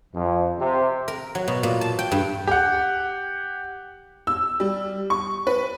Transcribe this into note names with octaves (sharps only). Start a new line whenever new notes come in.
F2
C3
A#4
F#3
B2
A#2
A5
G5
G2
G4 F#5
E6
G3
C#6
B4